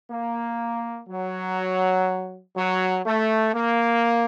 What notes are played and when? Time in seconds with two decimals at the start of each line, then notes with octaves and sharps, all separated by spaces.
0.11 A#3
1.09 F#3
2.56 F#3
3.06 A3
3.54 A#3